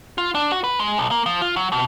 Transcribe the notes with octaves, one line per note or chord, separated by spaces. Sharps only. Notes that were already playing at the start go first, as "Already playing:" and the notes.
F4
D4
F#4
B4
G#3
B1
A#3
F3
F4
F#3
B2